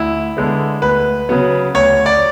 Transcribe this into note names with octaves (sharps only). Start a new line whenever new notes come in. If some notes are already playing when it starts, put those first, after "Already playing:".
Already playing: D2 E4
D3 G#3 B3
D2 B4
C#3 F#3 B3
D2 C#5
D5